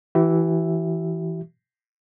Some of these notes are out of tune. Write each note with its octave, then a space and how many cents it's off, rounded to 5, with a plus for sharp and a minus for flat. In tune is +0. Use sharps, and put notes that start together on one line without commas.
E3 +0 G4 -45 E5 +0